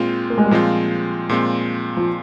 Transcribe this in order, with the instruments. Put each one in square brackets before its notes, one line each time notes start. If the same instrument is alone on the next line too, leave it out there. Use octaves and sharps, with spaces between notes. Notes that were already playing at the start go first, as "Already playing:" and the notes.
Already playing: [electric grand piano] A#2 G#3 C4 F4
[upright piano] A#3
G#3
G3
[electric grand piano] A#2 G#3 C4 F4 [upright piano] F3
[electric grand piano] A#2 G#3 C4 F4
[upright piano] F3